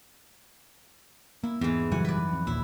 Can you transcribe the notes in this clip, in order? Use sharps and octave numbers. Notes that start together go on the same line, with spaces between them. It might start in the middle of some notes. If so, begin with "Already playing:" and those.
A#3 E4
E2 G#2 E3 B3
A#1 F#2 C#3 E3 F#3 G3 F#5 G#5
B4 D5
F2
A#1 D#2 A#2 E4